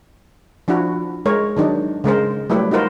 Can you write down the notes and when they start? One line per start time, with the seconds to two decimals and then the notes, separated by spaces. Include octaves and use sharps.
0.68 F3 D4 E4 F#4
1.26 G#3 A#4 C#5
1.57 D#3 F#3 D4 D#4
2.04 C#3 G#3 A#4 C5
2.50 F#3 G3 A3 E4 G4 B4
2.71 D#4 F4 F#4 A#4 C5